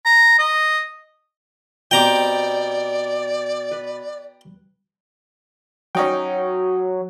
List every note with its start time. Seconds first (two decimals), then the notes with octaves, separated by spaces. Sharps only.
0.05 A#5
0.39 D#5
1.91 B2 C4 G4 D5 G5 A#5 D6
3.71 B4
5.95 F#3 C#4 D#4 G5